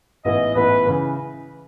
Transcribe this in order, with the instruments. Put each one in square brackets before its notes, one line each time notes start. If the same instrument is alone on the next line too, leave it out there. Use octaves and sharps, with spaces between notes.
[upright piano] A1 G#2 E3 B3 E4 [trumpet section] D#5
[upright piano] A1 G#2 E3 B3 E4 [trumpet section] B4
[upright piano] C#3 E3